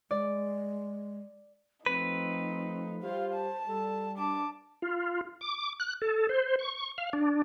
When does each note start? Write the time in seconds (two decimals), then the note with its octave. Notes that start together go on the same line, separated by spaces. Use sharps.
0.11 G#3 D5
1.86 F3 A3 C4 D#4 B4
3.03 G3 F4 G4 C5 F5
3.34 A5
3.68 G3 A4
4.18 D4 A5 D6
4.82 F4
5.41 D6
5.80 F#6
6.02 A4
6.29 C5
6.59 C#6
6.98 F5
7.13 D4